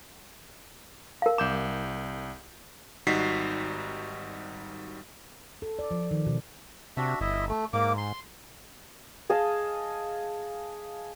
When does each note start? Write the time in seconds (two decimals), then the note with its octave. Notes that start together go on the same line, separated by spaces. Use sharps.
1.22 A#4 F5
1.38 C2 D6 G6 E7
3.07 G#1 G3 D#4 F#4 B6 C7
5.62 A4
5.79 D5
5.91 F3
6.11 D#3
6.26 B2
6.97 C3 D4 F#4 E5
7.21 G1 E4 D#5 E5
7.49 A3
7.73 G#2 A#3 D6
7.98 C6
9.30 G#4 D#5 F5 A5